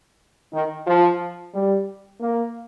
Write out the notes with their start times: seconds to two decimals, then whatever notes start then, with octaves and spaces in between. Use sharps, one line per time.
0.53 D#3
0.87 F3
1.54 G3
2.21 A#3